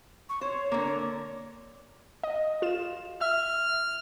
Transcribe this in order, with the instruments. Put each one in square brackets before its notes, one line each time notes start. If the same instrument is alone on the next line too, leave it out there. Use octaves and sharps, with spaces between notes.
[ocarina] C#6
[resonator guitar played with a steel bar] C5 [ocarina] C#5
[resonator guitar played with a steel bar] D3 A#3
[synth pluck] D#5
F4 E7
[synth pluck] E5 E6 [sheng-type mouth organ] F6